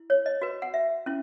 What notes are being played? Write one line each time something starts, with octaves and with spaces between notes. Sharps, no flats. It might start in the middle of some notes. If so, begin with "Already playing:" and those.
Already playing: E4
C#5
D#5
F#4 B4
F#5
E5
C#4 E4